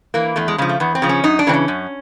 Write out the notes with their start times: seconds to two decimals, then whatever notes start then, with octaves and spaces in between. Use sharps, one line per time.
0.14 E3 A#3
0.36 E2 A3
0.48 G#3
0.58 C#3 F3 G#3
0.69 A3
0.80 E2 B3
0.95 C4
1.02 C#3 F3
1.09 C#4
1.24 F#2 D#4
1.39 D4
1.47 C#3 E3 C4
1.54 C#4
1.68 F#2